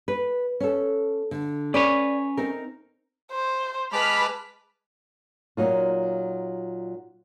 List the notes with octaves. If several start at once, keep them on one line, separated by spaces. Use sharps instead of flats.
B4
C#4 A4
D3
C#4 B4 C#5 D5
C4 D#4 A#4
C5
G#3 B4 A5 B5 D6 F6 B6
A#2 F#3 D#4 F4